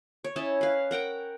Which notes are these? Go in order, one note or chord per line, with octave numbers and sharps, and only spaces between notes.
C#5
C#4 E4 D#5 A5
B4 F5
A#4 F#5 G5 A#5